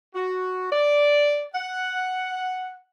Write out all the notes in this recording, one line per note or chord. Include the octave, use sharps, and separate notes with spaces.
F#4
D5
F#5